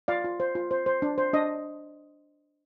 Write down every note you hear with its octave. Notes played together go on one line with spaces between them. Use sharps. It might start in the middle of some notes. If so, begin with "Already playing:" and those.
F4 D5 F5
F4
C5
F4
C5
C5
D4
C5
D4 D#5